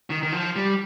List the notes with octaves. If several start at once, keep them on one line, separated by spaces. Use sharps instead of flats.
D#3
D#3
F3
G3